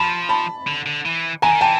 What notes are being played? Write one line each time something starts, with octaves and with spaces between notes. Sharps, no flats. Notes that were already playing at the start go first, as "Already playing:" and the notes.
Already playing: F3 A5 B5
A5 B5
D3
D3
E3
E3 G#5 A#5
D#3
E3 G5 A5